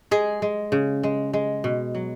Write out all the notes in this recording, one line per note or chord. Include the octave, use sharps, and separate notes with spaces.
G#3 G#4
G#3
C#3
G#3
G#3
B2
F#3